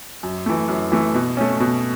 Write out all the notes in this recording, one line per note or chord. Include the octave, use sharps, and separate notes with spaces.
F#2
E3 A3
F#2
E3 A3
B2
A3 C#4
B2